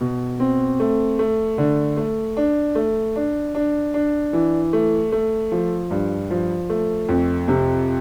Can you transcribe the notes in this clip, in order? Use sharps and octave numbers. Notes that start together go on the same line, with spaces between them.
B2
C4
A3
A3
D3
A3
D4
A3
D4
D4
D4
E3
A3
A3
F3
G2
F3
A3
F2
C3